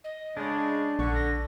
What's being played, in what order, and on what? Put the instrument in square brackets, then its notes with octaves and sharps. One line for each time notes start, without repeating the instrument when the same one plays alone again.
[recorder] D#5
[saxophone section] C#3 G#3 [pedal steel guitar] D4
[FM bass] A#1 [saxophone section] D3 [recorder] C#6
[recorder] A#6